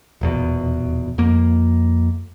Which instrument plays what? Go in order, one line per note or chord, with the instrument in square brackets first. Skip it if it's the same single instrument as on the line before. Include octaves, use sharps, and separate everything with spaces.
[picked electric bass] D#1 E2 B2
F2 A#3